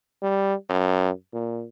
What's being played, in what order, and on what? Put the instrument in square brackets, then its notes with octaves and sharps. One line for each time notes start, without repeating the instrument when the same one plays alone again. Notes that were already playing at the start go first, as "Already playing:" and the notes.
[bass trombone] G3
F#2
A#2